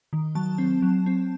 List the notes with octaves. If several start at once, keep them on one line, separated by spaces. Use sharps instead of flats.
D#3
F#3 A5
C4
F#3
C4